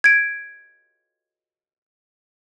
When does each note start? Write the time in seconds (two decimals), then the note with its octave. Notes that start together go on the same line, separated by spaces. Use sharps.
0.04 G#6 D7